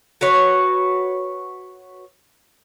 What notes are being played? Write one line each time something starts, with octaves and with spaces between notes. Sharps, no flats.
F#4 B4 C#5